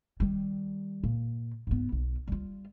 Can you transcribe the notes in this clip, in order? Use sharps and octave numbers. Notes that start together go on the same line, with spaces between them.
D#3 G3
A#2
G#2 B3
B1
G3 F4